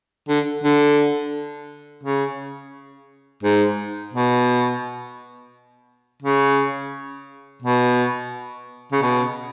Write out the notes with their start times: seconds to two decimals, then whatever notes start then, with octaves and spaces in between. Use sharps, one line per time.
0.29 D3
0.64 D3
2.04 C#3
3.43 G#2
4.13 B2
6.23 C#3
7.62 B2
8.92 C#3
9.02 B2